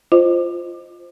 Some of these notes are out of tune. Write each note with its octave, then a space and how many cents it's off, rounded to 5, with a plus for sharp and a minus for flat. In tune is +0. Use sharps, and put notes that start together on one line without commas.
F4 -5 C5 +0 D#5 -10